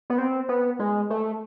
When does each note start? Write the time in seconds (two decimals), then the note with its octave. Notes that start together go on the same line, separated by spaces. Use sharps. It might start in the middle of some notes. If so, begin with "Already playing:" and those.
0.10 B3
0.18 C4
0.49 B3
0.79 G#3
1.10 A3